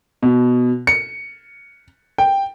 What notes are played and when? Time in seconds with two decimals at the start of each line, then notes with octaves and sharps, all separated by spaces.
0.22 B2
0.87 C#7
2.18 G5